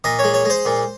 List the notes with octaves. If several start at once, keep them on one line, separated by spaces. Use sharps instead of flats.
A#2 D#5
G#3 C#5
C#5
G#3 C5
A#2